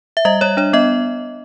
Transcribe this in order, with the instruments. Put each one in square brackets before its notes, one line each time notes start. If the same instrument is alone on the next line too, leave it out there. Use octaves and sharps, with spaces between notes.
[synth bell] E5
G3 D#5
G3 C#5
D4 C#5
B3 D#5